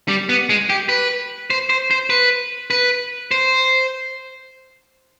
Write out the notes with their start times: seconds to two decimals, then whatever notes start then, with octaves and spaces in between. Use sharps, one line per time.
0.08 G3
0.29 B3
0.49 G#3
0.70 G4
0.89 B4
1.50 C5
1.70 C5
1.91 C5
2.10 B4
2.70 B4
3.31 C5